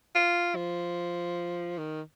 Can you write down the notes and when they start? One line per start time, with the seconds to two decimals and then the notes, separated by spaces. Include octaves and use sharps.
0.15 F4
0.56 F3
1.78 D#3